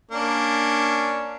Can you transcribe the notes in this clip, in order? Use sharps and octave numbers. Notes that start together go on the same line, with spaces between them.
A#3 C#4 D4